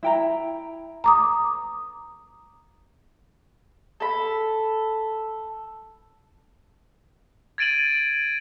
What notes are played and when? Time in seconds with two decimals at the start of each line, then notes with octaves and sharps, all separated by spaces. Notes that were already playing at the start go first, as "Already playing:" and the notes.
0.03 E4 G5 A#5
1.04 A#5 D6 D#6
4.00 A4 B5
7.58 G#6 A6 D7 D#7 F#7